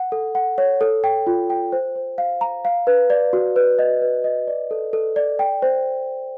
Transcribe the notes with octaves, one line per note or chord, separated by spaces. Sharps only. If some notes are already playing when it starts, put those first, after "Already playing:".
Already playing: F#5
A4
F#5
C#5
A4
G5
F4
G5
C5
C5
F5
A#5
F5
B4
D5
F#4
B4
D#5
B4
D#5
D5
A4
A4
D5
G5
C5